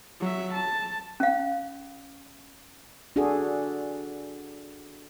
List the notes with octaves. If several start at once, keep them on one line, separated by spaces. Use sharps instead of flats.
F#3 E5
A5
C#4 F5
D4 F#4 G#4 A4